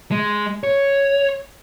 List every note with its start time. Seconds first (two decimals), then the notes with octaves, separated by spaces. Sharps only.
0.11 G#3
0.64 C#5